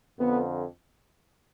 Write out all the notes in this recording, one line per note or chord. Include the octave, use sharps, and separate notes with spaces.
F2 D3 B3